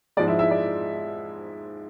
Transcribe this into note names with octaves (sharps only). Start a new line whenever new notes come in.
G#2 F3 G#3 D5
E4 E5
E4 E5
D5